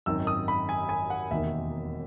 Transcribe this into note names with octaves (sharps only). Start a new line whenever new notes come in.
G#1 F#2 D#3 E6
D#6
B5
G#5
G#5
F#5
E1 D#2 D#3 A#3 E5